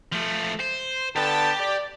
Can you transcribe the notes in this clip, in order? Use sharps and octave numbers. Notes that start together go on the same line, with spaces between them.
F3 A3
C5
D3 B3 G4 G5 A5
D5